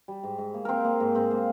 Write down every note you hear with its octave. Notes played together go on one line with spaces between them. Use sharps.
G3
G#2
G#2
A#3
A#3 C4 A#4 C5
A#3
G#2
G#2 C4 C5
A#3